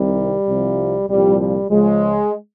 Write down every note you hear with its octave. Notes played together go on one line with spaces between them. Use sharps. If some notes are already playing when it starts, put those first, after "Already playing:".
Already playing: C2 C3 D#3 G3
C2 C3 F3
C2 A#2 F3 G3
G3
C#2 C#3 F3 G#3